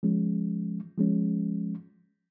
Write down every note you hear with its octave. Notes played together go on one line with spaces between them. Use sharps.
F3 G#3 C#4
F3 G#3 C#4